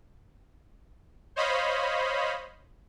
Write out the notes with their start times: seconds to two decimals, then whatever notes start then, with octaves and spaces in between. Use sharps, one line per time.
1.36 C5 C#5 D#5 F5 B5